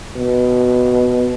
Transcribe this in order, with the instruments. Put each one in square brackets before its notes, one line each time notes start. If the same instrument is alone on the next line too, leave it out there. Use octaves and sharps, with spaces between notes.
[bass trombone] B2